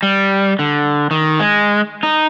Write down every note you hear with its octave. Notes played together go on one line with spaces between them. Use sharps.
G3
D3
D#3
G#3
D#4